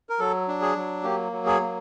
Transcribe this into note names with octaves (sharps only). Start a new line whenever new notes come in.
A#4
F#3 A4
D4
G#4
F#3
A#3 G4
F#3
G#4
A#3